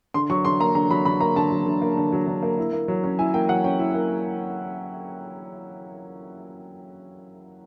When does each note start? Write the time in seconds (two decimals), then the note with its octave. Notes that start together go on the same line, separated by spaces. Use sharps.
0.14 D3 C6
0.30 F#3 C#6
0.45 D3 C6
0.60 A#3 A#5
0.75 D3 A#5
0.90 F#3 B5
1.05 D3 B5
1.20 A#3 A#5
1.36 D3 A5
1.51 F#3
1.66 D3
1.82 A#3
1.97 D3
2.12 F#3
2.27 D3
2.43 A#3
2.58 E4
2.73 A#3
2.88 F#3
3.04 C#4
3.19 E4 G#5
3.34 A#3 G5
3.49 F#3 F#5
3.64 C#4 G5
3.79 E4
3.94 A#3